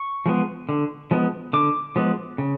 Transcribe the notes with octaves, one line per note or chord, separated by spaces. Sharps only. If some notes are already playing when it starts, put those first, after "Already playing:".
Already playing: C#6
F3 G#3 B3
D3
F3 G#3 B3
D3 D6
F3 G#3 B3
C#3